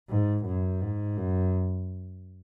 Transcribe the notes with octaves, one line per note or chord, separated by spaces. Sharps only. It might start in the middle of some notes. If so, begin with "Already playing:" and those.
G#2
F#2
G#2
F#2